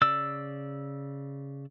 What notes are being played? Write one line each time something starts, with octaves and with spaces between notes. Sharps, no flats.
C#3 D5 E6